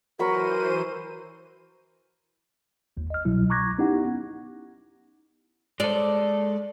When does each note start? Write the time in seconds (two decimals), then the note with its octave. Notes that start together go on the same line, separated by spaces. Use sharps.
0.19 E3 F#3 A#4 C5 B5 C#6 D#7
2.97 G1 D#2
3.10 D#5 F6
3.25 C2 B2 F#3 E4
3.50 A#5 C#6 D6 F#6 G#6 A#6
3.78 B3 C#4 D#4 E4 G4 F#5
5.80 G#3 A4 D5